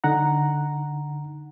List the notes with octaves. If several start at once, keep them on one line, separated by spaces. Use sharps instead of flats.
D3 D#4 F#5 A#5